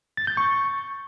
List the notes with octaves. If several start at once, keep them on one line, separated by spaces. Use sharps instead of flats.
A6
G6
C#6